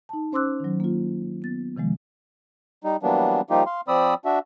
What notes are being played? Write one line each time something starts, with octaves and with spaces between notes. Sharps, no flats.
D#4 A5
C#4 C5 C6 D6 E6 F#6
D#3 F#3
A#3 F4
B3 A6
C3 D#3 F3 G#3
G3 D#4
E3 F#3 G3 A#3 B3 D4
F3 G3 A#3 D#4 F4 G4
F5 C6
F3 C4 D5 B5 D#6 E6
D4 F#4 E5